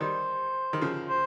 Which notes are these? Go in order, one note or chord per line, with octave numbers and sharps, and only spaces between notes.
D#3 G3 C5
D#3
C#3 F3
C5